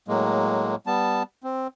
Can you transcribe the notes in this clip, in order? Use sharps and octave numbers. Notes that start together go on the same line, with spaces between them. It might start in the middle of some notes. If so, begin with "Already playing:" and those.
A2 F#3 G#3 A#3
G3 B3 A5
C4